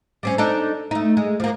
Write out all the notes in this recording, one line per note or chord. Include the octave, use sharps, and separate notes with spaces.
G3 C4 C#4
D4 D#4 A4
A3 D#4
G#3
F3 A#3